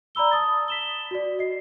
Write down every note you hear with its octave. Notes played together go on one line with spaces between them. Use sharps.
D5 A#5 B5 E6 G7
A5 D#6 A6
B6 E7 G7
F#4 D5
D#5 C7